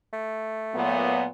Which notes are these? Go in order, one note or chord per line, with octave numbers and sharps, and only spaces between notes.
A3
A#2 F#3 B3